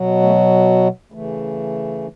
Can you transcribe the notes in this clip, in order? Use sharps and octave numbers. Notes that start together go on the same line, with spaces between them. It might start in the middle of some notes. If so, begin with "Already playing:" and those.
Already playing: B2 F#3
A3
C#3 E3 A3